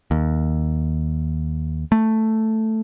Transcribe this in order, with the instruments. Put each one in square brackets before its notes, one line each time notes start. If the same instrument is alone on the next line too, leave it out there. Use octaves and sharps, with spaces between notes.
[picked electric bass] D#2
A3